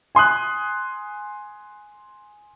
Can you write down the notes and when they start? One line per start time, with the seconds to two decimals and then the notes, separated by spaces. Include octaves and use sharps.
0.15 G#5 C6 D#6 F#6